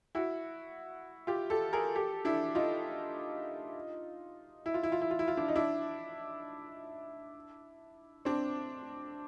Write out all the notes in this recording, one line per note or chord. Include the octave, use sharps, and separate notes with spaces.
E4 F#4
F4 G4
G4 A4
G#4 A#4
G4 A4
D4 E4
D#4 F4
E4
F4
E4
F4
E4
F4
E4
F4
D4 E4
D#4
D4 E4
C4 D4